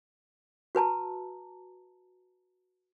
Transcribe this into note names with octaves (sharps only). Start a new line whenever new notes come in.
F#4 B4 A5 A#5